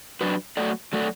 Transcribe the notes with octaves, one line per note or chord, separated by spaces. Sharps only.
F#3 D4 F#4 B4
F#3 A3 F#4 A4 D5
F#3 A3 F#4 A4 D5